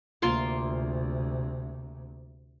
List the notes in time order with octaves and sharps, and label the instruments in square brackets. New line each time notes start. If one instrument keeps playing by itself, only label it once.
[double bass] D2 C3 [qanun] A#3 F4 C6